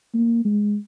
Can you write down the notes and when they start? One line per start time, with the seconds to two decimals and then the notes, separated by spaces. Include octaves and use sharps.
0.14 A#3
0.45 G#3